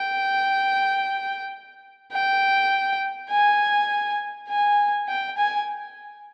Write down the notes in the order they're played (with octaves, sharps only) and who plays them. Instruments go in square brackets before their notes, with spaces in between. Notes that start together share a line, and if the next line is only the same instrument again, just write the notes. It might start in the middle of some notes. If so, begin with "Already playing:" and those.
Already playing: [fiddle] G5
G5
G#5
G#5
G5
G#5